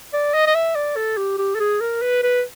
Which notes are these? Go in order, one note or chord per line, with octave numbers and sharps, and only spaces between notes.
D5
D#5
D#5
E5
D5
A4
G4
G4
A4
G#4
A#4
B4
B4